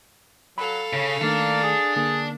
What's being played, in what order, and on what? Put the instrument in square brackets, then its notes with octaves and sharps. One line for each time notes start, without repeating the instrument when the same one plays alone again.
[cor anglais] F#3 [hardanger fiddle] A4 F5 [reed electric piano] B5
[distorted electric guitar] C#3 [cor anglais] C#5
[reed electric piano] D#3 A3 [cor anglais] A#3 [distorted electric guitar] D4
[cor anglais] G#4
[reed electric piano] D3 A#3 [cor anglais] G#4